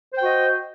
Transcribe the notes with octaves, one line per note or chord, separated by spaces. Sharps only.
F#4 C5 D#5 G5